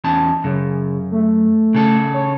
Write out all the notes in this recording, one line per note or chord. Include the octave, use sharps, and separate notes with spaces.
E2 C#4 A5
F#2 C#3
A3
C#3 A4
C#5